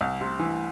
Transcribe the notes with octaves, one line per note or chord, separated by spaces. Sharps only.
C2
C3
E3